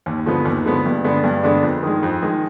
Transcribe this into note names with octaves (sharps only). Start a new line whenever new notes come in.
D#2
D3 F3 G#3 B3
D#2
D3 F3 G#3 B3
G2
D3 G#3 B3 D4
G2
D3 G#3 B3 D4
F2
D#3 G#3
F2
D#3 G#3